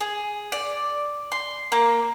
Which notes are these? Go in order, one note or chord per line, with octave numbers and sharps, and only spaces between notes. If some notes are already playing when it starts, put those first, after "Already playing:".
G#4
D5
C6
A#3